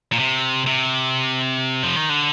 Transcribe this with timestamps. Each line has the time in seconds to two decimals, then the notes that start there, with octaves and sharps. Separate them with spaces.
0.12 A#2
0.19 C3
0.66 C3
1.83 F3
1.96 D#3
2.09 D3